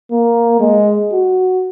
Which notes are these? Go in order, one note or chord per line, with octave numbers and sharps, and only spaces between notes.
A#3
G#3
F#4